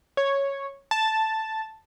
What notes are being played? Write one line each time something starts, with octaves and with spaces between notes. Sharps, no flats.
C#5
A5